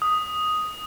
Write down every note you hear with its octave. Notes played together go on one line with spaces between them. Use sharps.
D#6